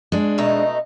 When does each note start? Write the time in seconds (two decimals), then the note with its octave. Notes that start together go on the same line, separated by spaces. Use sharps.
0.12 G#3 D4
0.38 B2 A3 D#4